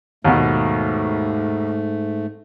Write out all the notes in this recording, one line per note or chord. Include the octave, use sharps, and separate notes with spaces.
D#2 G#2 B2 A3